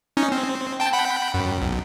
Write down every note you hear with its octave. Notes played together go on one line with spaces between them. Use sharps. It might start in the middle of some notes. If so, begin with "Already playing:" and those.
C#4 D#4
C4
G5 A5
F#5 G5 B5
F#2
B1